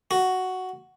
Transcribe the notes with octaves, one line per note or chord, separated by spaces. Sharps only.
F#4